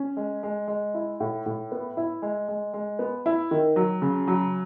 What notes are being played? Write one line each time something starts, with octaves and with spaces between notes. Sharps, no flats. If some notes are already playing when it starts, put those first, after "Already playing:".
Already playing: C#4
G#3
G#3
G#3
E4
A2
A2
B3
E4
G#3
G#3
G#3
B3
E4
D#3
F#3
C#3
F#3